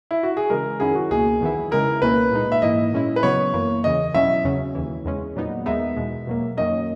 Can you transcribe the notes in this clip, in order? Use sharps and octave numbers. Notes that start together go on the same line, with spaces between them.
E4
F#4
G#4
C#3 E3 G#3 A#4
F#2 D#3 F#3 C#4 E4 G#4
F#4
C#2 B2 A#3 G#4
E2 D#3 F#3 B3 E4
C#3 G#3 B3 E4 A#4
C#2 B2 A#3 C#4 E4 B4
A#2 G#3 D#4
E5
G#2 E3 A#3 E4 D#5
A#2 G#3 C#4 E4
B4
C#3 F#3 B3 C#5
F#2 E3 A#3
E2 C#3 E3 D#5
B2 F#3 C#4 E4 E5
E2 C#3 F#3 C#4
D#2 C#3 E3
E2 C#3 G#3 C#4
A#2 F#3 B3 D#4
D#2 D#3 G#3 B3 D#4 E5
E2 B2 G#3
B2 F#3 A#3
F#2 D#3 F#3 A#3 C#4 D#5